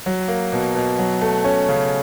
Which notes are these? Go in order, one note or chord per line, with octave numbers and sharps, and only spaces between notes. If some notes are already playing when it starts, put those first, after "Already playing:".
F#3
A#3
B2
B2
F#3
A3
C#4
C#3